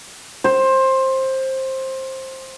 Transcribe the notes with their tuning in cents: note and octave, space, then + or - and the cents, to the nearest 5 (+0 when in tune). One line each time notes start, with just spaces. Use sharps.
C5 +15